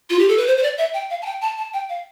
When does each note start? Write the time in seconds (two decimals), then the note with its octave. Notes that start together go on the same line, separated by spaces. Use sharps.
0.10 F4
0.19 G4
0.29 A4
0.38 B4
0.47 C5
0.57 C5
0.63 D5
0.78 E5
0.94 G5
1.10 F5
1.22 A5
1.26 G5
1.42 A5
1.58 A5
1.73 G5
1.89 F5